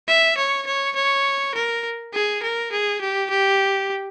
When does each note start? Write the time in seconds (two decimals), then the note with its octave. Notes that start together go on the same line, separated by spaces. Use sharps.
0.08 E5
0.37 C#5
0.67 C#5
0.96 C#5
1.54 A#4
2.13 G#4
2.42 A#4
2.72 G#4
3.01 G4
3.30 G4